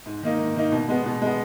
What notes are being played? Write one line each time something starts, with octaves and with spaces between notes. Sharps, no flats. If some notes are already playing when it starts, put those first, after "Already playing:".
G#2
D#3 A#3 D#4
G#2
D#3 A#3 D#4
B2
G#3 B3
B2
G#3 B3